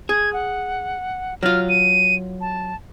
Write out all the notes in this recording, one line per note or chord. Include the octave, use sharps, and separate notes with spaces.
G#4 G#6
F#5
F#3 F4 F6
D#7
A5